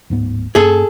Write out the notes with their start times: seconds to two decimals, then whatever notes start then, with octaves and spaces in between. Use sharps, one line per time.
0.10 D1 G#2 B3
0.55 G2 A#3 C#4 G#4 A4